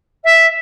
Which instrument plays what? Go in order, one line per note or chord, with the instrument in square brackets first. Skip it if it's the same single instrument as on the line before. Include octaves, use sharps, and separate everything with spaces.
[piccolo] E5